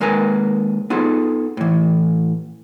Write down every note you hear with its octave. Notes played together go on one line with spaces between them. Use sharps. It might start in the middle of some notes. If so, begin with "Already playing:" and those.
D#2 G#3 A#4 B4 G#5 A#5
B3 D#4 F4 G#4 A4
A2 E3